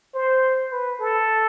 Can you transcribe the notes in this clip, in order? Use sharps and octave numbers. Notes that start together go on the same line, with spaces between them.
C5
B4
A4